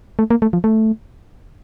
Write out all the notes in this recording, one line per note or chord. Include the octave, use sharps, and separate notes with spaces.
A3
A#3
A3
F3
A3